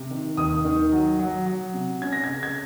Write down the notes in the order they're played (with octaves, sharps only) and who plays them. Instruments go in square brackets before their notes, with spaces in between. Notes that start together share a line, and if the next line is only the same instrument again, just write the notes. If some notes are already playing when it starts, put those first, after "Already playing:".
Already playing: [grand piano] C3
D#3
D#2 D#6
D#3
F#3
F#3
F#3
C3
C#4 G#6
A#6
C#3 G#6
G#6